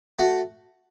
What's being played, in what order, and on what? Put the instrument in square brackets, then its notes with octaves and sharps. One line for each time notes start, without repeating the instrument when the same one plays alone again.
[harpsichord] A3 F#4